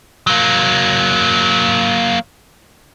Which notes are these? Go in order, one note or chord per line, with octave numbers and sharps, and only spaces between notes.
F#3 A#3